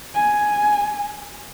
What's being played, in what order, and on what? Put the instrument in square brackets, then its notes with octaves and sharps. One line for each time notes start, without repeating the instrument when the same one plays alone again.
[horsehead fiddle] G#5